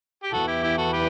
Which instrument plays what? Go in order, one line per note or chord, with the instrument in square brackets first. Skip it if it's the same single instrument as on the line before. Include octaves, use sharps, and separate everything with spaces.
[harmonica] G4
[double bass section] E2 E3 [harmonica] F#4 A4
[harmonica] E4 G4
E4 G4
F#4 A4
G4 B4